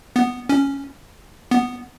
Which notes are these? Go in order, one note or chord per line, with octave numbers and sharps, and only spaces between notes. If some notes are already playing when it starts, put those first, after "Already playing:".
B3
C#4
B3